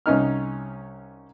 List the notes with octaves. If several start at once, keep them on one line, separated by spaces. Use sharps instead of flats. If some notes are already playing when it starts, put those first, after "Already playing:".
C2 C#4 D#4 F6